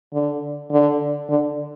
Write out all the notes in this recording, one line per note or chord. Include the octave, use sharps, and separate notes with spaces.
D3
D3
D3